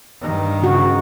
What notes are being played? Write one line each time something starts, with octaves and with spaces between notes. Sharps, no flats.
G2 D#3
C#3 F#4